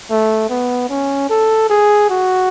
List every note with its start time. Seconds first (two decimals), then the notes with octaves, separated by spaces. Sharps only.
0.10 A3
0.50 B3
0.89 C#4
1.30 A4
1.70 G#4
2.09 F#4